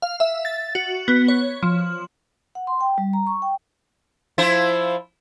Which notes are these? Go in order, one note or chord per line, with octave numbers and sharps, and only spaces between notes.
F5
E5
A6
F#4
B3
C#5
F3
F#5
C6
G5
G3
A#5
C#6
G5
F3 E4 C5